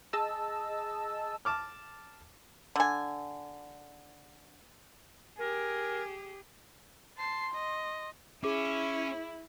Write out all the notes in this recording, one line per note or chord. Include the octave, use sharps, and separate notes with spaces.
G#4 D#5 A5 E6
A5 D6 F6
D3 G#5
G4 G#4 A#4 G#5
A5 C6 C7
D#5
C#4 E4 G#4 D6